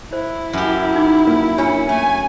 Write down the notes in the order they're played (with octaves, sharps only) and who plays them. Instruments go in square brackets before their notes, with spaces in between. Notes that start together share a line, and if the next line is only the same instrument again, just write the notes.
[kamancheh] E4 [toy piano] C5
[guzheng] F#2 G4
[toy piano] D#4 D6
[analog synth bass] A#3 [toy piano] B4
[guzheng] C#4 [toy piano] D4 F4 C#5
[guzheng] A3 [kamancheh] G#5